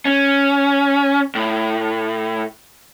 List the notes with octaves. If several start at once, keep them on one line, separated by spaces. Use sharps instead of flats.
C#4
A2